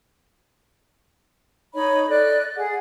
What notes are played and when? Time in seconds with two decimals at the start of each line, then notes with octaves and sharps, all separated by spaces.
1.73 D#4 C#5 D#5 B5
2.09 A4 D5 D#5 F#6
2.56 G#4 F#5